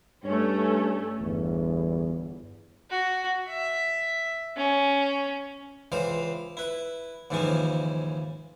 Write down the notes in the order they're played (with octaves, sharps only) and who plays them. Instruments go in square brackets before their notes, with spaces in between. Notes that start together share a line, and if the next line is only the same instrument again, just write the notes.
[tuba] G2 [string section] A3 C#4
[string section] G1 [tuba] E2
[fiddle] F#4
E5
C#4
[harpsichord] C#2 E3 C5 F5
E4 B4
D#2 G#2 C#3 E3 F3 C#4